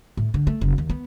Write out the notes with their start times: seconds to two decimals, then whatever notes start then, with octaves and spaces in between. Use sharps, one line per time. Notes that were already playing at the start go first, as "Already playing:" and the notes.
0.17 A2
0.34 D3
0.47 A3
0.61 F#1
0.78 D#2
0.90 B3